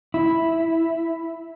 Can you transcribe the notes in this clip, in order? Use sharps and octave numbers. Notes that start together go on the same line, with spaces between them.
E4